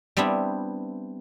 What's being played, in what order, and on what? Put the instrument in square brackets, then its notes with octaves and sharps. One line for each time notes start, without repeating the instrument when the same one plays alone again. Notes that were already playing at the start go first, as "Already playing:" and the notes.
[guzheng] G3 B3 C4 D4 E4